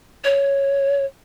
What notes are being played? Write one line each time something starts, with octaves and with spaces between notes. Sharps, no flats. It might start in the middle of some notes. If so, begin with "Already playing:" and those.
C#5